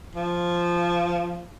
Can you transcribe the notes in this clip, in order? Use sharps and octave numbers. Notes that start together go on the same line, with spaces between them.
F3